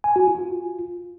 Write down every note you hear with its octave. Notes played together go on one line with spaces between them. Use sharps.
G#5
F#4
F4